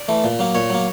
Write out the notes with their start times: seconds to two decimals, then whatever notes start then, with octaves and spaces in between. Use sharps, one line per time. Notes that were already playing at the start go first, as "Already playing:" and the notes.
Already playing: D5
0.08 E3 A3
0.24 A#2
0.39 F#3 A#3
0.55 A#2 C#5
0.70 F#3 A#3